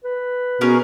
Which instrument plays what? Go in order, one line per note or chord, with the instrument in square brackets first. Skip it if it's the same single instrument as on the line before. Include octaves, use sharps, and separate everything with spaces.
[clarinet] B4
[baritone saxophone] B2 [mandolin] C#4 G#4 A#4